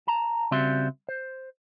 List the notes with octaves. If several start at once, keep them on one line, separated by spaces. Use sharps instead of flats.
A5 A#5
C#3 G3 C4 F#4 E5 C6
C5